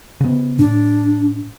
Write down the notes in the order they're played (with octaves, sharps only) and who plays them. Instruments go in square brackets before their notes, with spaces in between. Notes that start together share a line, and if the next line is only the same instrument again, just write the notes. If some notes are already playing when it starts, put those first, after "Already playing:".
[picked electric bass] C#3 B3
[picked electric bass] A2 [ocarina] D4